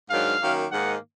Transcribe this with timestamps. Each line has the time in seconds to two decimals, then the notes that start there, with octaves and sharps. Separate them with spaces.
0.10 G#2 D#3 F#3 D4 F5
0.41 F#2 D#3 F#3 A#3
0.72 G#2 D#3 A#3 D#4 F#5